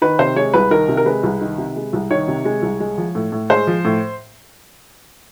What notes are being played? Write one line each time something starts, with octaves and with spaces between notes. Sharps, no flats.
D#3 B4
C3 C5
G#3 C#5
C2 B4
D#3 A#4
C3
A#4
G#3 B4
C2
D#3
C3
G#3
C2
D#3 C#5
C3
G#3
C2
G#3
F3
A2
A2
G#3 C5
F3
A2